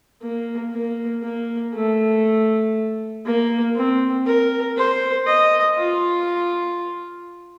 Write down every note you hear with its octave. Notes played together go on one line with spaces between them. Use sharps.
A#3
A#3
A#3
A3
A#3
C4
A#4
C5
D#5
F4